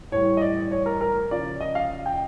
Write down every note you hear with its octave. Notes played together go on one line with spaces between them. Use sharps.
A2 E3 G3 C#5
D#5
D5
C#5
A#4
A#4
C#3 F3 D5
D#5
F5
G5